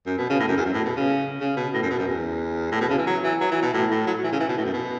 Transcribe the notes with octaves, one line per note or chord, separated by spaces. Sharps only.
F#2
B2
C#3
A2
F#2
E2
F#2
A2
B2
C#3
C#3
B2
A2
F#2
B2
F#2
E2
A2
B2
C#3
E3
F#3
E3
F#3
E3
B2
A2
A2
F#3
E3
C#3
E3
B2
A2
F#2
B2